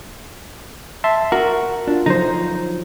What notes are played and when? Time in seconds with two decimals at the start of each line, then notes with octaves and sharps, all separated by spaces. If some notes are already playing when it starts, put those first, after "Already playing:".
1.04 E5 A5 C6
1.32 F#4 A#4
1.88 D4 F4
2.06 D3 F3 F#3 D#4 C5 A#5